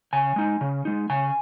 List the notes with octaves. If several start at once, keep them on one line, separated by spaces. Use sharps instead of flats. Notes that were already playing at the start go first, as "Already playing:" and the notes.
C#3 G#5
G#3 D#4
C#3
G#3 D#4
C#3 G#5